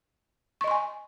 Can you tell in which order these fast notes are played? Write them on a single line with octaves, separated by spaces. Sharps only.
C#6 D#5 C6 G#5